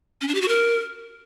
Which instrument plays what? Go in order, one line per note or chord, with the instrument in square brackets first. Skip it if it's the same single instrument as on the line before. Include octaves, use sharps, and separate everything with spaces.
[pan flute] C#4
D4
G4
F#4
A#4